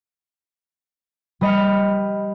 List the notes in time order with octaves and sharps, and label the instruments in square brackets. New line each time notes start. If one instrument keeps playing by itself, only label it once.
[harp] G3 B4 D#5 G5 F6 C#7